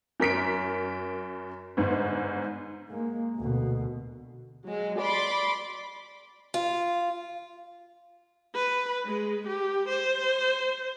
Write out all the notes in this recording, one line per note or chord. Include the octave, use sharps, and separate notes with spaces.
F#2 A#4 B6 D7
G1 G#2
G#3 A#3
D2 B2
F#3 G#3
D5 B5 C6 D6
F4
B4
G#3
G4
C5